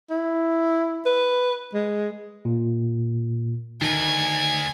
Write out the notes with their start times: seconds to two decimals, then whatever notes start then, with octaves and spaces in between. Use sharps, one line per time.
0.10 E4
1.06 B4
1.74 G#3
2.45 A#2
3.81 D2 D#3 G#5